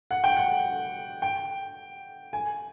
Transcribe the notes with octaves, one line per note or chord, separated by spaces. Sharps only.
F#5
G5
F#5
G5
G#5